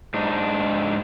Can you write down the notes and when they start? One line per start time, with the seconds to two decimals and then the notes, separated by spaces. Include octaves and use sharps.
0.14 G#2 D4 D#4